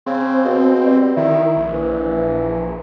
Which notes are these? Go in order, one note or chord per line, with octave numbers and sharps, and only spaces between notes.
C#3 C4
B2
G3
D#3 E4
A#1
E3